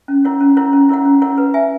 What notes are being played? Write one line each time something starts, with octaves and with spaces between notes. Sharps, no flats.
C#4
E4 A#4 C#5 F#5
C#4
E4 A#4 C#5 F#5
C#4
E4 A#4 C#5 F#5
C#4
E4 A#4 C#5 F#5
B4
E5 G#5